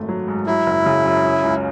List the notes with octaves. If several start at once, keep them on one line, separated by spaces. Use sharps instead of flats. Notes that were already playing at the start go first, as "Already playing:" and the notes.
Already playing: G#1 F#2 A3
F#3
G#2
F#3 E4
F#1
C#3
F#2
C#4
C#2